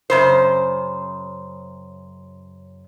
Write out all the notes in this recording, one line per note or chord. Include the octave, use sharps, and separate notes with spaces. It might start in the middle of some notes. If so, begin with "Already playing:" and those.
F#2 C#3 C5